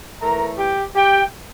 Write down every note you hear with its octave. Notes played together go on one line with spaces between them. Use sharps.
A2 E3 A3 A#4 A#5
G4 G5
G4 G5